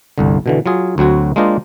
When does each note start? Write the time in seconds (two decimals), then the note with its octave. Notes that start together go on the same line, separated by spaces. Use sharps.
0.18 G1 C2 D3
0.46 B2 D3 E3
0.66 F#3 F4 G#4
0.98 D2 F#3 C4 F#4 C#5
1.36 G#3 A#3 D4 F4 C5 D#5